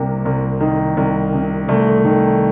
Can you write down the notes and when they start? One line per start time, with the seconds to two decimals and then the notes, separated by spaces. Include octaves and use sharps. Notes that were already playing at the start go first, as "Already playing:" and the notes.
Already playing: C2 C3 A#3
0.25 C2
0.61 D#3
0.97 C2
1.33 C3
1.68 C2 A3
2.04 D#3